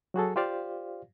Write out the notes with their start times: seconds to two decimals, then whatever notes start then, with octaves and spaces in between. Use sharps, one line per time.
0.14 F#3 F#4 G#4 A4
0.36 F4 G4 C5 D5 F5